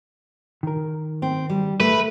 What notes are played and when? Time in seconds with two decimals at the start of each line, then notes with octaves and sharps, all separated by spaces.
0.63 D#3 A#4
1.22 C4
1.50 G3
1.80 A3 B4